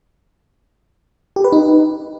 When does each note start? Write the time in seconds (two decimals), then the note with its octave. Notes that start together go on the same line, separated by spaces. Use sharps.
1.36 G4
1.44 B4
1.52 D#4